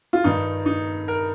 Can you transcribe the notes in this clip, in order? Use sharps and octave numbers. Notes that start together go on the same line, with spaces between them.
F4
G2 D#3 D#4
D#4
A#4